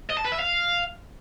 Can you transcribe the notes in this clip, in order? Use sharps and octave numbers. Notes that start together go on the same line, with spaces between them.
D#5
A5
B4
E5
F5